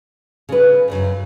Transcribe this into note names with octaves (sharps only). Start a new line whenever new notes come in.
C#3 B4
F#2 A2 C#3